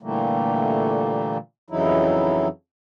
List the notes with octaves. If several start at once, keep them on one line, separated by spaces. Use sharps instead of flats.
A#2 D3 E3 G3 A3 A#3
F2 C#3 E3 F#3 D#4 E4